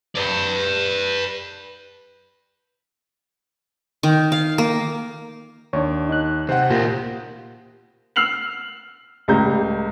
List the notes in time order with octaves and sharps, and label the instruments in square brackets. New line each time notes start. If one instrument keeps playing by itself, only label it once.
[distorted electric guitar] B4 D5
[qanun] D#3
F5
A#3
[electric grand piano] D#2 [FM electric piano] D4 C#5
[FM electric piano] D#4 F#6
[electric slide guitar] C3 [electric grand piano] C5 F#5
[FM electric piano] A#2 [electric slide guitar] A#3 G4 A#4 [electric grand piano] F4
[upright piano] E6 F6 C7 F7 F#7
C#2 A2 G3 A#5 G6